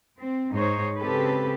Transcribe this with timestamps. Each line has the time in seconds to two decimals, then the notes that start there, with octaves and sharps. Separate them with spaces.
0.19 C4
0.54 G#2 D#4 C5 C#5
0.98 C#3 C4 G4 A4 B4